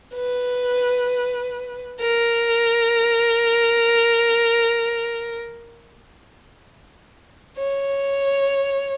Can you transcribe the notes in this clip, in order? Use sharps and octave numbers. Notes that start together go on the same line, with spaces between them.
B4
A#4
C#5